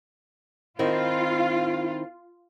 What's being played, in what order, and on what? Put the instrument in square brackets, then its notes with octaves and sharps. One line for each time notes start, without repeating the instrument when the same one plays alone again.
[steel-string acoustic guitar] D#3 C4 E4 [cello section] F4